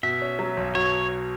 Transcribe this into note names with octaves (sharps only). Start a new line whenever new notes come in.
B2 E5
C#4
F#3
B1
B2 C#5